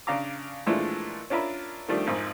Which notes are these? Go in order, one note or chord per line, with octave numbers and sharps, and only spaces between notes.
C#3 D4 F5 A#5 D6
A#2 E3 F3 G#3 A3 D4
C#4 D4 F4 A#4 E5 B5
D#3 F3 G3 A3 D4
G#1 F2 G#2